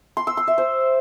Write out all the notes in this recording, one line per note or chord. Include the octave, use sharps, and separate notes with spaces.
C6
E6
C6
E5
C5